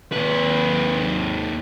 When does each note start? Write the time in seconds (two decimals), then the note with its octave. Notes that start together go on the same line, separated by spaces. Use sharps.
0.13 D#2 B4